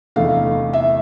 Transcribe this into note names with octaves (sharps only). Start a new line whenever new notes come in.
F1 E2 D3 A3 F5
E5